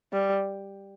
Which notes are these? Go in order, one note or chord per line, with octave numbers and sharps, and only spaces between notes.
G3